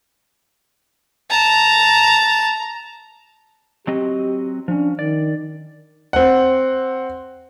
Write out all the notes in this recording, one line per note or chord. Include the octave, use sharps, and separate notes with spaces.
A5 A#5
F#3 C4 G4 D#5
F3 C#4 D4
D#3 D5
C4 F#5